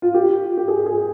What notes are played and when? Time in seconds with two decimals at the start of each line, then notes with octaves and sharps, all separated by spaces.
0.02 F4
0.14 G4
0.58 G4
0.68 G#4
0.86 G#4